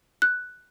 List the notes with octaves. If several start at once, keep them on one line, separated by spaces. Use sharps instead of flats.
F#6